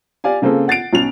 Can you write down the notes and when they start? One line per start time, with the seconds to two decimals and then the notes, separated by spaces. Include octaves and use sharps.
0.24 G4 D5 F5 G#5
0.42 C#3 A#3 C4 G#4 A4
0.68 F#5 A6 C7 D7
0.93 B1 C#4 F7